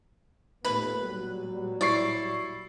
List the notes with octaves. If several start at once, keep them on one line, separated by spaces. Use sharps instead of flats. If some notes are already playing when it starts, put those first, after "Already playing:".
D#2 A#2 A3 B3 B4
A#2 F#3 G3
E4 D5 C#6 C7